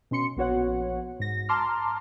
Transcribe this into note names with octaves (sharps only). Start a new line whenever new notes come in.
B2 C#4 C6 C#7
A#1 B3 F#4 C#5 F#5
G#2 A#6
A5 A#5 C6 D6 F6